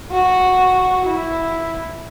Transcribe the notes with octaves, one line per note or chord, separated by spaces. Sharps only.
F#4
E4